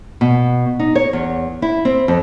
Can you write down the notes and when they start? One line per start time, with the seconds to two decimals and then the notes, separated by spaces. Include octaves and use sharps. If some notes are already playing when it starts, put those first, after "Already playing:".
0.21 B2
0.79 D#4
0.95 C#5
1.13 E2
1.62 E4
1.85 C4
2.08 F2